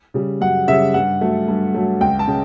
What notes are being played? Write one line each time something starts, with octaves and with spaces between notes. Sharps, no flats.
C#3 G3
F#2 F#5
C#3 G3 E5
G2 F#5
F#3 A3
G2
F#3 A3
C#2 G5
A5
C#3